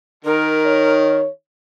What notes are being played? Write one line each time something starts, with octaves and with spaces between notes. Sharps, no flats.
D#3 A#4
C#5